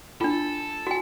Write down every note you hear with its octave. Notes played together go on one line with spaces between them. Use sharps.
D4 F4 A4
F#4 G#5